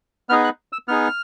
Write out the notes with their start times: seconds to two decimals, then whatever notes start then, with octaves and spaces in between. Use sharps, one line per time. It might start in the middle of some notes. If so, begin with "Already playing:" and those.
0.29 B3 D#4 G#4 F6
0.44 F#6
0.73 E6
0.88 B3 D#4 G#4 F6